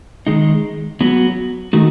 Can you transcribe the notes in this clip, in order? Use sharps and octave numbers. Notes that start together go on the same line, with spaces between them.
D#3 G#3 D#4
F#3 B3 F#4
D#3 A3 D#4 F#4